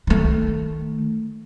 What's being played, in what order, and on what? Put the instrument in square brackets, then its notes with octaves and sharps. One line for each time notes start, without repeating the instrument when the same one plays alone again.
[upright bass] D#3 A3